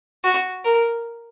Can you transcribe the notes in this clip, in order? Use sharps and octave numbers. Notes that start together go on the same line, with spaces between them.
F#4
A#4